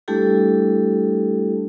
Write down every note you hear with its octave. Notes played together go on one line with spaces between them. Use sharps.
G3 A3 D4 E4 G4 A4